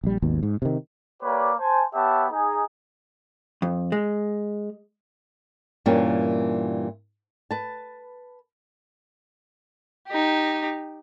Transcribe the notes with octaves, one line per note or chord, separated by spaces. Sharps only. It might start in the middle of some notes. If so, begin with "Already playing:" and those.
A#1 G3
G#1 D#2 B2
G#2
C3 D#3
A#3 G4 B4 C#5 D5
C5 G#5 A5
B3 G4 C#5 E5 F#5 A5
D#4 G#4
F2
G#3
G2 A#2 E3 G3 A#3 C#4
B4 A5
D#4 G4